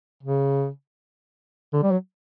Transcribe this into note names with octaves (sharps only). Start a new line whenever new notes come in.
C#3
D3
G3
F#3